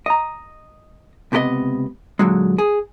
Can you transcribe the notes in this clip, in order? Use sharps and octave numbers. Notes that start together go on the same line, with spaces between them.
D#5 A#5
C#2 C3 B3 A#4 D#5
A#2 D3 F#3 G#3
G#4